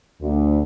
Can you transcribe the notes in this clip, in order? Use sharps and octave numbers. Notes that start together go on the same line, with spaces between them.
D2